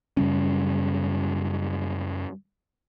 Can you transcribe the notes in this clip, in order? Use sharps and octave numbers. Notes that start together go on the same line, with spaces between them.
F#2 C#3 G3 C#4